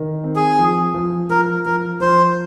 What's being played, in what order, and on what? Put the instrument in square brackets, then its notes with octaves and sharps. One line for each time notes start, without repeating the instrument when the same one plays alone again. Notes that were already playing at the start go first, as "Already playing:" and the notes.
Already playing: [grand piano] D#3
C4
[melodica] G#4
[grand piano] F3
F3
[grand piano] F3 [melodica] A#4
[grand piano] F3 [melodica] A#4
[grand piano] F3 [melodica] C5